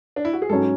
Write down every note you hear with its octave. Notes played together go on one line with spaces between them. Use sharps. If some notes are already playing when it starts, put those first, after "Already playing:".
D4
E4
F#4
G#4
G#2 F#3 C#4 F#4 A4